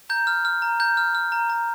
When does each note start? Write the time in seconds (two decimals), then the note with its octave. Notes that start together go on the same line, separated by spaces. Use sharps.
0.10 A#5 G6
0.27 F6
0.45 F6
0.62 A#5
0.80 A#5 G6
0.97 F6
1.15 F6
1.32 A#5
1.50 A#5